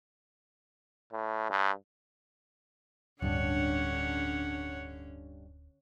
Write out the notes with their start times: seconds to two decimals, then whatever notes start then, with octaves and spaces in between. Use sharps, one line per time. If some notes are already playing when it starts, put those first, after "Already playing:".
1.13 A2
1.50 G2
3.22 D1 G2 D3 C#4 D4 C#5 F#5